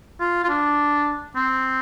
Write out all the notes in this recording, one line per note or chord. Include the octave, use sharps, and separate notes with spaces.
F4
F4
D4
C4